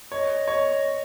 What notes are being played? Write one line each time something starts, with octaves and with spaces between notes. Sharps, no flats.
C#5 D#5
C#5